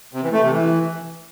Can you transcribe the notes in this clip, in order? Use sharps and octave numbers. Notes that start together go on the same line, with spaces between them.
C3
E3
A3
C3
E3